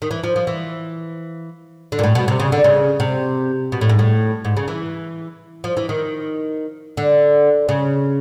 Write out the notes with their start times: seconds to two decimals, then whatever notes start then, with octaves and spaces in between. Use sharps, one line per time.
0.02 D#3
0.11 E3
0.24 F3
0.36 F3
0.47 E3
1.92 D3
1.99 A#2
2.04 A2
2.15 B2
2.28 C3
2.40 C#3
2.52 D3
2.64 C#3
3.00 C3
3.72 B2
3.81 A2
3.89 G#2
3.99 A2
4.45 G#2
4.57 C#3
4.68 E3
5.64 F3
5.77 E3
5.89 D#3
6.97 D3
7.69 C#3